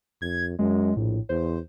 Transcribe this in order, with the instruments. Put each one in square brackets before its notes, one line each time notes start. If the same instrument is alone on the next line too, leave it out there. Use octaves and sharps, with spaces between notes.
[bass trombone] F2 [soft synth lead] G#6
[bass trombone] F#2 [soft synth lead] G#3
[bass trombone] A#1 [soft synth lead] A2
[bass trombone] E2 [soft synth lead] C5